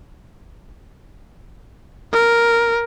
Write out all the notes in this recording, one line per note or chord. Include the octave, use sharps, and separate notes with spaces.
A#4